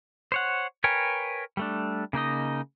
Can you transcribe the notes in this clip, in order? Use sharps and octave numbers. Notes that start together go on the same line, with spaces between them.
C5 C#5 F#5
A#4 B4 C#5 G5 G#5
G3 A3 D4
C#3 A#3 D#4 D#5